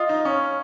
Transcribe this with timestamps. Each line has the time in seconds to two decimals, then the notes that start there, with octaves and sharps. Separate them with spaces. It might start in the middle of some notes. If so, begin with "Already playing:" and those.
Already playing: F4 D#5
0.09 D#4
0.25 C#4 C#5